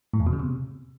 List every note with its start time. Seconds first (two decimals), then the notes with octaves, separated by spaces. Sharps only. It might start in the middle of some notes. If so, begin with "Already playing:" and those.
0.14 A2
0.20 E2
0.27 B2
0.33 C#3
0.40 C3